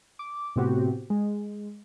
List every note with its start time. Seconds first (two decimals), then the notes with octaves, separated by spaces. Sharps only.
0.19 D6
0.56 A2 C3 B3 C4 F#4 G4
1.10 G#3